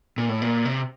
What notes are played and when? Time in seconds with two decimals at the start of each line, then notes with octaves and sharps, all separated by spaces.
0.18 A#2
0.29 A2
0.42 A#2
0.65 C3